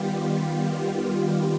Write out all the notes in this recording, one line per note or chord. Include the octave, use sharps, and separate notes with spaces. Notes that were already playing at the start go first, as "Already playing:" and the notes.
Already playing: D#3 G3 B3 F4 G4
F4
G4
F4